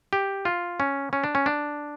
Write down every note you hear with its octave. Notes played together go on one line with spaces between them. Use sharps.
G4
F4
C#4
C#4
D4
C#4
D4